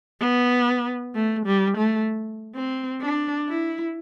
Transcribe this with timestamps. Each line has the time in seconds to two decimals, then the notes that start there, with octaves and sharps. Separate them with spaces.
0.20 B3
1.15 A3
1.46 G3
1.77 A3
2.55 C4
3.02 D4
3.48 E4